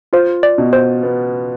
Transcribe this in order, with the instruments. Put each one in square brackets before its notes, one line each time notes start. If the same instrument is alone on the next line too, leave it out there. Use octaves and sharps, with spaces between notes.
[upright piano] F4 [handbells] C5
[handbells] D5
[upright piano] B2
[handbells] C5
[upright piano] B3